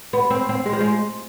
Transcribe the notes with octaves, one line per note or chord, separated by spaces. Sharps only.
B3
C4
C4
G#3
F3
G#3